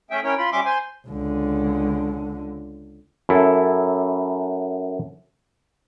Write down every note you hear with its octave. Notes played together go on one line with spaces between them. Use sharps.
A3 C#4 G#4 E5 G5
C#4 E4 A#4 C#5 G5
F4 B5 C6
G3 C#4 E5 C6 D6
C5 G#5 C6
C#2 D3
F#2 E4 A4